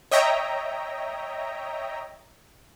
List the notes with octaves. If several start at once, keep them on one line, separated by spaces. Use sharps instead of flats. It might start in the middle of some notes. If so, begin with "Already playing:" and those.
C#5 D#5 E5 G5 A#5